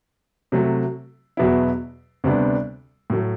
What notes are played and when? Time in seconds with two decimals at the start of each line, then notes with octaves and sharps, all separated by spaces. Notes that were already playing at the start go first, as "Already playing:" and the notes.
0.52 C3 F#3 A3
1.37 E2 B2 F#3 B3 E4
2.24 D2 C3 G3 B3 D4
3.10 A2 F#3 A3